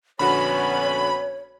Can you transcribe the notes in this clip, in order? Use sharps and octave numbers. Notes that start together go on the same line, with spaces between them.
A#1 D3 B3 C#4 F#4 C#5 B5